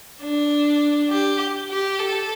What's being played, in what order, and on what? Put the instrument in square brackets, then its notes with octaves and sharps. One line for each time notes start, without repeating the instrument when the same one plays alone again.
[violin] D4
G4
G4
A4